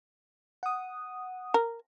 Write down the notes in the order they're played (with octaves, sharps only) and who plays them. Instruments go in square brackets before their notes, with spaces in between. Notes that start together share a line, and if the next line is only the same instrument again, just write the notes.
[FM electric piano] F#5 D#6
[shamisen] A#4